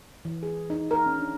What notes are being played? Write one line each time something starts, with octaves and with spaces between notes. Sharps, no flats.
E3
G#4
D#4
A#4
C#4
D4